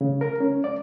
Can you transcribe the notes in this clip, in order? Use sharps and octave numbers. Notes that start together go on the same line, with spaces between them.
C#3
A#4
C#4
D5